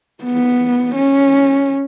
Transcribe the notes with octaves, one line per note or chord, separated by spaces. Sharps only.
B3
C#4